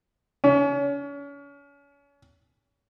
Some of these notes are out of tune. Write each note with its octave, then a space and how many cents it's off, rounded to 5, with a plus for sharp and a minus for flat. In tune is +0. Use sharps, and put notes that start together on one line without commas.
C#4 +35